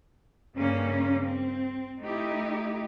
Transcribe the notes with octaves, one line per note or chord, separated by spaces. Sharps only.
G2 C#3 A#3 C#4
C4
A3 D#4 E4 G4